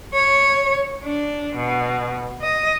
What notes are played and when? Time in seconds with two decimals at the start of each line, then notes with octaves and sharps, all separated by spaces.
0.14 C#5
1.04 D4
1.56 B2
2.42 D#5